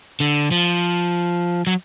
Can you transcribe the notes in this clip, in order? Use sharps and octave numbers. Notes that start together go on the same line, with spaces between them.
D3
F3
F#3